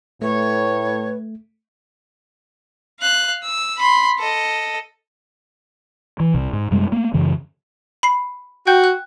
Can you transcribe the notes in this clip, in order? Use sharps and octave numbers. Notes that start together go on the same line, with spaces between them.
A2 A3 B4 C#5
F5 F#6
E6
B5 C6
A4 D#5
E3
C2 C3
G#2
F#2 C3 G3 G#3
A3 A#3
F#2 C#3 E3
B5 C7
F#4 G5 G6
F#6